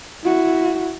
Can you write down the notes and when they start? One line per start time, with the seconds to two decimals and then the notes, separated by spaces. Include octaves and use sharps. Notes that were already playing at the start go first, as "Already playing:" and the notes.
0.24 E4 F#4